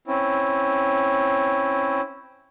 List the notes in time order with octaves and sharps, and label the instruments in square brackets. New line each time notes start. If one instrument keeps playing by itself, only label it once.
[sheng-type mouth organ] C4 C#4 E4